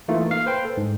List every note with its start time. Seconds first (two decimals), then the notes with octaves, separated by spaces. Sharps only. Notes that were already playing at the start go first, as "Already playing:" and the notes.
0.08 E3 A3 A#3 D#4 F4
0.31 A#3 F5
0.46 B4 C5 G5
0.65 A4
0.77 G#2